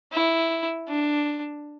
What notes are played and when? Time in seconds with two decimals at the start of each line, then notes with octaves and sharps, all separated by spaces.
0.12 E4
0.88 D4